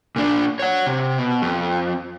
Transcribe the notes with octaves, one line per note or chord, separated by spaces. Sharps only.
A#2 D4
C#5 F#5
C3
B2
F2